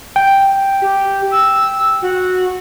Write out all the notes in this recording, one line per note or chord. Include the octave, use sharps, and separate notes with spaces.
G5
G4
E6
F#4